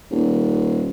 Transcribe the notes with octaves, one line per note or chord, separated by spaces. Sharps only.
D#1